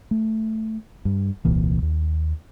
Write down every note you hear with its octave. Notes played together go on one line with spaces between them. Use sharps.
A3
G2
D#1 C2 A#2 E3
D#2